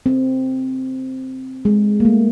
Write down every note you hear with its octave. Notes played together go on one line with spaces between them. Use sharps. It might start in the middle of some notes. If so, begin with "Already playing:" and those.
C4
G#3
A#3
A3